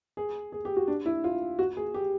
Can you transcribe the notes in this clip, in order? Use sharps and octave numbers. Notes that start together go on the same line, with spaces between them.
G#4
G#4
G4
F#4
D4
E4
F4
F#4
G#4
G4